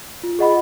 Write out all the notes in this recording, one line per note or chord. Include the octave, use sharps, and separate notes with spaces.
F4
G#4 D#5 F#5 B5